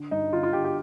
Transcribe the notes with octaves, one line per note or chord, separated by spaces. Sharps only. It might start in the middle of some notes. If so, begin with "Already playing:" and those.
Already playing: D3
G2 D#4
D3 F4
F4
D3 G4
G4